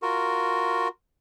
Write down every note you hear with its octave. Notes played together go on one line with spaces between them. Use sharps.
F4 F#4 A#4